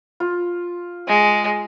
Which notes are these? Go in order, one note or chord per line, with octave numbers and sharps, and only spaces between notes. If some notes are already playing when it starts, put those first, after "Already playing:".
F4
G#3